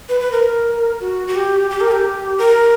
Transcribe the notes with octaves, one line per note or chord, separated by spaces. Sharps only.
B4
B4
A#4
F#4
F#4
G4
G4
A#4
G4
A#4